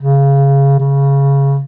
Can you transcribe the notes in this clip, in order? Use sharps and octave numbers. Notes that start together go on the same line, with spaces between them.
C#3
C#3